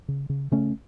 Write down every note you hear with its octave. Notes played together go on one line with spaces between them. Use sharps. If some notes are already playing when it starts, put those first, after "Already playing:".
C#3
C#3
C#3 A3 C#4